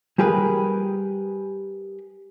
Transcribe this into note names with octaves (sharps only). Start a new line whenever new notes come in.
G3 G4 G#4 A#4 B4